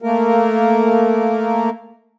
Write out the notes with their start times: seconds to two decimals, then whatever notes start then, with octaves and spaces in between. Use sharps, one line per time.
0.02 A3 A#3 A#4